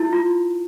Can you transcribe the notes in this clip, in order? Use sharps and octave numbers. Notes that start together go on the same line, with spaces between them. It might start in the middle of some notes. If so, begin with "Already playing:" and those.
Already playing: E4 F4
F4